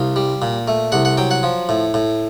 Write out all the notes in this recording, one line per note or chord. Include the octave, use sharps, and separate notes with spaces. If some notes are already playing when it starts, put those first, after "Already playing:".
Already playing: C2 F5
G3
A#2
A3
C2 F#5
F#5
F#3 G5
F#5
F3
A2
A2